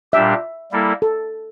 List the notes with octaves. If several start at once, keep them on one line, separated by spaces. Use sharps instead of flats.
A#2 G3 D4 G4 E5
G3 A#3 E4 A4
A4